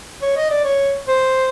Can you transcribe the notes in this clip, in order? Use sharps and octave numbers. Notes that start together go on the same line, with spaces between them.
C#5
D#5
D5
C#5
C5